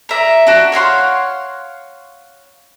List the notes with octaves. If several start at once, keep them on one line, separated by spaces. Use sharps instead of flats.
D5 E5 A#5
D4 F#4
C#5 F5 F#5 C6